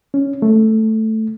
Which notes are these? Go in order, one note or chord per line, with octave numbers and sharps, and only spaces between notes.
C#4
A3